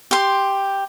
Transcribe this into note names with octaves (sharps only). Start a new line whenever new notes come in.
G4 C6